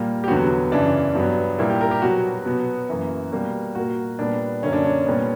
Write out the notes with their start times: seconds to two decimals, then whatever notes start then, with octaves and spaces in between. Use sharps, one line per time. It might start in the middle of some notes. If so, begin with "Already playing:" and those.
Already playing: A#2 G3 A#3
0.24 G4
0.28 E2 D3 F#3 B3 F#4
0.71 F#2 C#3 E3 D4
1.15 G2 F#3 B3
1.59 A#2 G3 A#3 E4
1.70 G4
1.81 A#4
1.91 G4
2.02 B2 F#3 B3 F#4
2.46 B2 F#3 B3
2.89 F#2 E3 A#3
3.32 B2 G3 A#3
3.75 A#2 A#3 F#4
4.19 A#2 G3 B3 D4
4.63 F#2 D3 A#3 C#4
4.73 D4
4.85 C#4
5.06 A#2 G3 B3